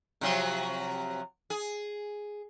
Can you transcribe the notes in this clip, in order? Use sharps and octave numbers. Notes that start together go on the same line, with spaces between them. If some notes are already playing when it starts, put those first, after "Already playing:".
C3 F3 F#3
G#4